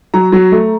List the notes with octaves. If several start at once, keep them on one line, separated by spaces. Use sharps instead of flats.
F#3 A#5
F#3
A3